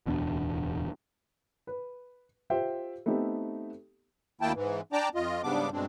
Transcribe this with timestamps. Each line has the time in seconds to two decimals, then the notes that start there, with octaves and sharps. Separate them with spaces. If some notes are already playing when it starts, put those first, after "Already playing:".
0.06 D1 E2 B2 D4
1.67 B4
2.50 F4 G4 C5 E5 G5
3.06 A3 B3 C4 D#4 G4 A4
4.41 D2 D#3 A#3 E4 G5 A5
4.55 G#2 E3
4.93 D4 D5 G5 A5 A#5 D6
5.15 F2 F4 D#5
5.43 G#2 C#3 G3 B3 D4 D6
5.72 G2 B2 G#3 C4 D4